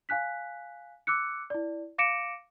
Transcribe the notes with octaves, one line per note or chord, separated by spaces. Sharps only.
F5 G#5 F#6 B6
D6 E6 F#6 C#7
E4 D5
F5 D6 A#6 C#7 D7 E7